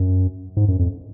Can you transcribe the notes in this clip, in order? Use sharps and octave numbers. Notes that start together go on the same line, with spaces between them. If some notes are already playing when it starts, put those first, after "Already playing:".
Already playing: F#2
G#2
F#2
F2